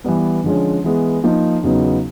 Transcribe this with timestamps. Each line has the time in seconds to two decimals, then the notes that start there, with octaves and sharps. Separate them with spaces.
0.04 E3 G3 B3
0.44 D3 F3 G#3 C#4
0.84 E3 G#3 B3
1.23 F3 A#3 D#4
1.63 E2 C#3 F#3 B3 D#4